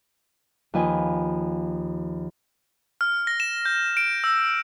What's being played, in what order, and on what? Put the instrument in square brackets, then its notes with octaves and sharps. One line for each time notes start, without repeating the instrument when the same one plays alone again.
[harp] D#2 F3 B4 D#5 G#5
[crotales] F6
A#6
E7
G6
D7
E6